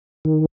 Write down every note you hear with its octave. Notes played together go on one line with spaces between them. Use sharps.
D#3